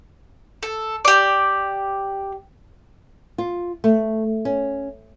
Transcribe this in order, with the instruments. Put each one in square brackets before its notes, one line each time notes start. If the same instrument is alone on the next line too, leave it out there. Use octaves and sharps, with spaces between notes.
[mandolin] A4
G4 D5
[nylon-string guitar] F4
A3
C#4